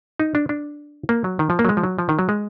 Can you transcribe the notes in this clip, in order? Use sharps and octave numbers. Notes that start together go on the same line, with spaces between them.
D#4
D4
D4
A#3
F#3
D#3
F3
A#3
F#3
G#3
F3
F#3
F3
D#3
F#3
G#3